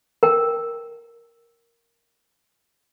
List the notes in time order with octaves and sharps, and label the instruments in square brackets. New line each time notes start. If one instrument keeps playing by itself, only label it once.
[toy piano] A#4 G5